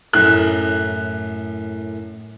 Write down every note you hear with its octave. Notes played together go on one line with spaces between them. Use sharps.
F#2 A2 F#6